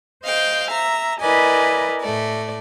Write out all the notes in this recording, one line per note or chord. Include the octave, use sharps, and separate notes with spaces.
C5 D#5 F5 G5
E5 A#5
E4 A#4 B4 D5 D#5 G#5
A2 A3 D5